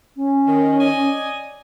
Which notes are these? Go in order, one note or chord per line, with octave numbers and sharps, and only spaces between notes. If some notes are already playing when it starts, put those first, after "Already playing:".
C#4
D#3
D5 D#5 G#5